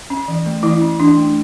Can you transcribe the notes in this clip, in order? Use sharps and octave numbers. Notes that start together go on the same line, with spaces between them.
C#4
E3
A3
E3 E4
C#4
E3 D4
A3